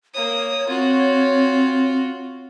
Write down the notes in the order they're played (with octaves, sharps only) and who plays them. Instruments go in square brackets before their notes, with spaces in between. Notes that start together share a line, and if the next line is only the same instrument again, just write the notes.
[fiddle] A#3 D#6 [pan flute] C#5
[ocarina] C4 [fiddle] F4 F#4